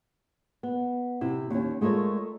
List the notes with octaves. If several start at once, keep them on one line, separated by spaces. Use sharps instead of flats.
B3
C3 E4
D#2 C#4
G#3 A3 F4 A#4 C#5